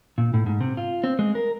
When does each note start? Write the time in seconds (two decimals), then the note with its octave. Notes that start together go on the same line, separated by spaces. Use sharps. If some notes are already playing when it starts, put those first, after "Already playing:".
0.18 A#2
0.34 A2
0.46 G#2
0.61 C3
0.77 F4
1.04 C4
1.19 G#3
1.35 A#4